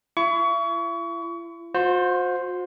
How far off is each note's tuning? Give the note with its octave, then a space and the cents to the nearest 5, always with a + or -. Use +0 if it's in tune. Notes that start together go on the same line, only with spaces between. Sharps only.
E4 +40 C#6 +30
F#4 -45 C5 +0